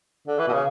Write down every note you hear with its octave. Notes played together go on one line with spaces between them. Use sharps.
D3
E3
B2
C#3